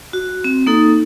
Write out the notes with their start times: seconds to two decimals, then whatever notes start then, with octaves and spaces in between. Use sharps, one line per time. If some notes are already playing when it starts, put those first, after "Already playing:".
0.13 F#4
0.44 C4
0.67 A#3 D#4 A4